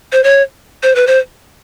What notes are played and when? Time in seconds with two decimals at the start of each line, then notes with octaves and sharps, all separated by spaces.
0.13 C5
0.24 C#5
0.83 C5
0.95 B4
1.07 C5